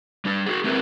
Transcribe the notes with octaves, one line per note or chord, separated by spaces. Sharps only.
G3 D4
F#4 G#4
G#3 C4 E4 G4 A#4 B4